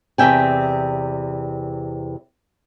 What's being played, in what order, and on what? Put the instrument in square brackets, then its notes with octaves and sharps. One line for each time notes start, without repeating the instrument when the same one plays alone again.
[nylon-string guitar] E2 C3 D5 E5 G5 G#5